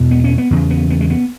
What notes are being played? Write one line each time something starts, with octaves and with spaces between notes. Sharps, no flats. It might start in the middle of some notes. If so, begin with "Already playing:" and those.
Already playing: E2 B2
B3
C#4
B3
E2 C#3
B3
B3
G#3
B3